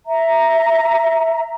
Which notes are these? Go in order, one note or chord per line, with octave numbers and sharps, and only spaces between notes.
E5 A#5